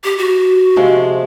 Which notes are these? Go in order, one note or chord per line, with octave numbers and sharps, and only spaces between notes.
G4
F#4
C3 F3 G#3